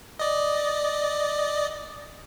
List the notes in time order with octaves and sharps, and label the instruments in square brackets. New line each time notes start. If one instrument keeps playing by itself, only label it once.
[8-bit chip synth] D5 D#5